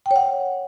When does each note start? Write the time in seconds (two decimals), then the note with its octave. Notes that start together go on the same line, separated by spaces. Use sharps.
0.06 G5
0.11 C#5
0.16 F#5